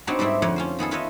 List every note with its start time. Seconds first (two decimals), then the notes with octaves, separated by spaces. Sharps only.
0.07 B3 C4 D4 D#4 F#4 C#5
0.19 G#2 G3 A3 C4 D4 E4
0.42 F2 D3 C#5 D5 F#5 G5
0.56 C#4 F4 C5
0.79 D#3 B3 G#4 A4
0.91 F4 B4 C#5 D#5 E5